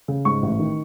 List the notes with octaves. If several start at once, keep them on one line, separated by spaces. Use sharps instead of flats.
C#3
G#2 C#6
A1
D#3